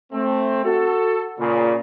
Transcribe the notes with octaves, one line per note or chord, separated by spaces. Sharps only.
A3 C4
F#4 A4
A#2 C#3